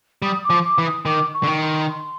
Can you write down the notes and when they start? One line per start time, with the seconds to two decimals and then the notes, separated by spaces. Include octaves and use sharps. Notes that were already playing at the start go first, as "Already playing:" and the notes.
0.22 G3 D#6
0.44 D6
0.50 F3
0.64 D6
0.78 E3
0.85 D#6
1.06 D#3 D6
1.33 C#6
1.43 D3
1.47 D#3
1.61 C6
1.88 C6